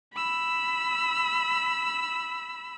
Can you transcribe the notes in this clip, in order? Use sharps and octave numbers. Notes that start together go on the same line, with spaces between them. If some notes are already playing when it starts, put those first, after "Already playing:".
B5 E6